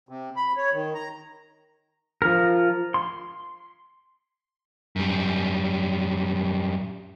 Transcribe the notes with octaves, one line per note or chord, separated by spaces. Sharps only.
C3
B5
C#5
D#3
A#5
F3 A#4
C6
F#2 G3